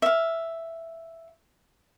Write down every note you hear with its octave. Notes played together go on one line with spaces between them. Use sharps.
E5 F5